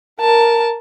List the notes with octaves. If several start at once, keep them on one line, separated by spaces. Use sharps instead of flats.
A#4 A5